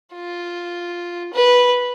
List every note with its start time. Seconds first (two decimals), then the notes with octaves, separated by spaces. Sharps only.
0.14 F4
1.34 B4